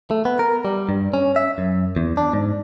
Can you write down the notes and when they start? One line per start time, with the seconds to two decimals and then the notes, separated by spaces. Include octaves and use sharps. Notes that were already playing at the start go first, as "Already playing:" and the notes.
0.11 A3
0.25 B3
0.39 A#4
0.65 G3
0.89 G2
1.14 C#4
1.36 E5
1.58 F#2
1.96 E2
2.17 D4
2.33 G#2